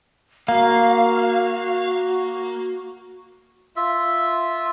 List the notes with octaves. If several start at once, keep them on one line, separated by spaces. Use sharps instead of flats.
A#3 F#4 F5
F4 E5